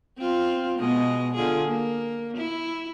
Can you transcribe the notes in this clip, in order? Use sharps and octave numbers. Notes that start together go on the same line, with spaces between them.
C4 F4
B2 G#3 D#5
D3 F4 G#4
A#3
E4